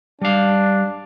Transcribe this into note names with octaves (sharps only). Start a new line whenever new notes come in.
G3 D4 F5